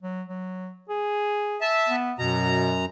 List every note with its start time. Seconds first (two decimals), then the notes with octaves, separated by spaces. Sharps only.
0.02 F#3
0.29 F#3
0.89 G#4
1.61 E5 A5
1.88 B3
2.19 F#2 B2 A#5